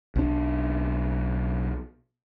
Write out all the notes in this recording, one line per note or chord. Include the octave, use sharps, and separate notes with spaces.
B1 D4